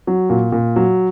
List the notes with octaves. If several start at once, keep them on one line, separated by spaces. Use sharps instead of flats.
F#3
A#2
A#2
F#3